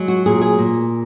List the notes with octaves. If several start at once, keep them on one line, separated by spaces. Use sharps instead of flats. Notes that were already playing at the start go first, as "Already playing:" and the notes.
Already playing: F#3 G#3
F#4
A#2 G#4
G#4
A#2